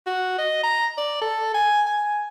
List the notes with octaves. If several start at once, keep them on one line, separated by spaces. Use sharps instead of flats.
F#4
D#5
A#5
D5
A4
G#5
G#5